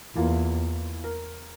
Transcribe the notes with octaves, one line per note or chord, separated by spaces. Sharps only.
E2 E3 A#3 F4
A#4